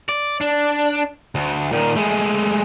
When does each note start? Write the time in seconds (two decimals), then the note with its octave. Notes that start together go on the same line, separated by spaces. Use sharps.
0.09 D5
0.41 D4
1.35 D2
1.73 A#2 D#3
1.97 G#3 A3